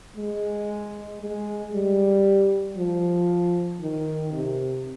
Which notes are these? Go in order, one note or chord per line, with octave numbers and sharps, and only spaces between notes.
G#3
G#3
G3
F3
D#3
C3